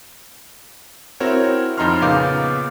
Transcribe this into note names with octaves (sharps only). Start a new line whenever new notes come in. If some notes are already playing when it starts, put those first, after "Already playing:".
C4 E4 F#4 A#4 C#5
F2 D#4 A#5 C6 F6
A#2 C#3 B3 F5 D6 G6